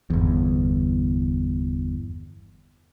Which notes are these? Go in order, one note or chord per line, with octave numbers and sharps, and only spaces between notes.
G1 E2